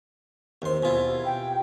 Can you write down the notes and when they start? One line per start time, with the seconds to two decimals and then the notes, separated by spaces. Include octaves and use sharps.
0.62 D#2 C3 C6
0.83 B2 E4 F4 G#4
1.25 G5